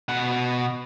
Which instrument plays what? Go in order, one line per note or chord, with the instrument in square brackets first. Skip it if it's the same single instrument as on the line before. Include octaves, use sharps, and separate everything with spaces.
[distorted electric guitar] B2 F#5